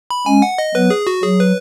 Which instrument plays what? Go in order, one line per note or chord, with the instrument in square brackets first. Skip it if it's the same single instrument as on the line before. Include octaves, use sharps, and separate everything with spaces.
[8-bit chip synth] B5
[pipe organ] G#3 C#4 [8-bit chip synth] G#5
[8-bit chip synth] F#5
D#5
[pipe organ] F#3 B3 [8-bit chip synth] B4
[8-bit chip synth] G#4
F#4
[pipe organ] F#3 [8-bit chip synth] G#4
[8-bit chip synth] B4